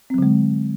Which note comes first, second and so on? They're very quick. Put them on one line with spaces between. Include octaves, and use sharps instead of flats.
C4 F#3 D3 G#3